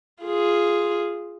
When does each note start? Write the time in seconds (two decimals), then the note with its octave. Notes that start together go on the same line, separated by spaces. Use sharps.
0.23 F4 G#4